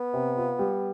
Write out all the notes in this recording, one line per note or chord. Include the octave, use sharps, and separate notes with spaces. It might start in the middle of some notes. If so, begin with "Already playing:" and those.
Already playing: B3
C3
F4
G3